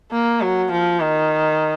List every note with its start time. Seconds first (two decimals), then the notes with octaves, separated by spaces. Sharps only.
0.12 A#3
0.41 F#3
0.72 F3
1.01 D#3